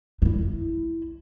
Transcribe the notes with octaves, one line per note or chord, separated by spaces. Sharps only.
D#4 E4